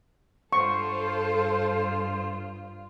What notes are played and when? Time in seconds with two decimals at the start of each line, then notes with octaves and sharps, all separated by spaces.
0.53 G2 F4 A4 C5 C#6